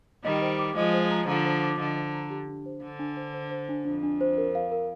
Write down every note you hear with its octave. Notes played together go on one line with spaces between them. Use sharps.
D#3 G3 D#5
C5
D6
F3 G#3 D#5
C5
A#5
D3 F3 A#5
C5
D6
D3 D#5
C5
A#5
G4
D4
C5
D3 D4
D4
C5
C5
C5
D4
F2 D4
D4
C5
A#4
F5
A#4